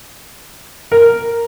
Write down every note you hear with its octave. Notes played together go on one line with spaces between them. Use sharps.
A#4